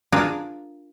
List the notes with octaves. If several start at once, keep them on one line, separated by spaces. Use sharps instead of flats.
D4 F4 G#4 A#4